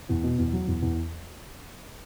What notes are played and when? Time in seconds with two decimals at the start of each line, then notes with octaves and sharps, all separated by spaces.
0.09 E2
0.23 B2
0.38 E2
0.53 F#3
0.67 E2
0.82 E2